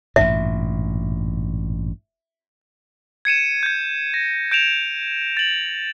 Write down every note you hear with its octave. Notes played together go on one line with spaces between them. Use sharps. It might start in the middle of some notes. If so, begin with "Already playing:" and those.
A1 G2 A#2 E5
G#6 C#7 D#7 E7
G6 G#6
A#6
G6 D7 E7 F7
A6 F#7